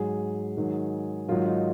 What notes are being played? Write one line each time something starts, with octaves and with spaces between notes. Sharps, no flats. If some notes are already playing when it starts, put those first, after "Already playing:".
Already playing: G#2 F#3 G#4
G#2 D#3 F#3
G#2 D#3 F#3 F4
D#4